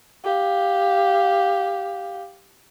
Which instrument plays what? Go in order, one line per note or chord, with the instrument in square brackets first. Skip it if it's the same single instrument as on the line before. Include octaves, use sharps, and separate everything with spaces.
[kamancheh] G4 F5